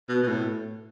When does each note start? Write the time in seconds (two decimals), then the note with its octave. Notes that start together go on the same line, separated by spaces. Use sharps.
0.09 B2
0.23 B2
0.28 A2